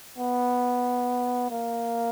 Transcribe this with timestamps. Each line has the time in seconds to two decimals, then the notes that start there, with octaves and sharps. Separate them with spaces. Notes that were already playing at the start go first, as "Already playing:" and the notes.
0.18 B3
1.50 A#3